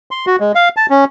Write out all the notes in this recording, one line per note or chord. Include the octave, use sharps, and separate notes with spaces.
C6
F#4
G#3
F5
A5
C#4